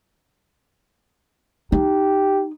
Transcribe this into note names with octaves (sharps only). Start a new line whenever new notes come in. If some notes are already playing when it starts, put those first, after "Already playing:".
D#4 G4